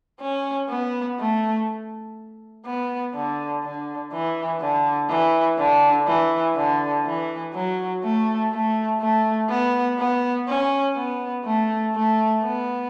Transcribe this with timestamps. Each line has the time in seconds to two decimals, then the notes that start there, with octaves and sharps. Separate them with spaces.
0.20 C#4
0.69 B3
1.19 A3
2.65 B3
3.15 D3
3.63 D3
4.12 E3
4.60 D3
5.09 E3
5.58 D3
6.07 E3
6.56 D3
7.05 E3
7.54 F#3
8.03 A3
8.52 A3
9.00 A3
9.49 B3
9.99 B3
10.48 C#4
10.96 B3
11.45 A3
11.95 A3
12.43 B3